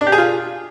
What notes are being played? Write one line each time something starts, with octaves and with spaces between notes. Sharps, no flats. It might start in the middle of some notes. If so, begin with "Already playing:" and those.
D4
G4
G#4
F4